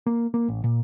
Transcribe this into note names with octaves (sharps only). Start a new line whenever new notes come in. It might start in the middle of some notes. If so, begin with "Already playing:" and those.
A#3
A#3
A1
A#2